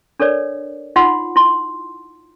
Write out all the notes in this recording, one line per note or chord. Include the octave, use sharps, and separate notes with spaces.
D4 A4 A#4 C#5 D5
D#4 F4 F#5 B5 C6
E4 C6